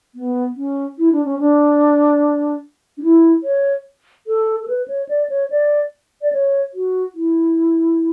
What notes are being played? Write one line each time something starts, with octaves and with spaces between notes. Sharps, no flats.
B3
C#4
E4
D4
C#4
D4
D4
E4
C#5
A4
A4
B4
C#5
D5
C#5
D5
D5
C#5
F#4
E4